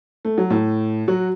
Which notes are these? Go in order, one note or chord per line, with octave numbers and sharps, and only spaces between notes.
A3
F#3
A2 A3
F#3 F#4